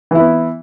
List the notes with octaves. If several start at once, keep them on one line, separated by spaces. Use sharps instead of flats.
E3 B3 E4